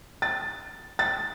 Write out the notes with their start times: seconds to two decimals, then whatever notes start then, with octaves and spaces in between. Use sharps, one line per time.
0.22 A6
0.99 A6